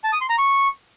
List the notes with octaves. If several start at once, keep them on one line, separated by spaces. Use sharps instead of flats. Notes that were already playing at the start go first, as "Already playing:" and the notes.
A5
D#6
C6
A#5
C#6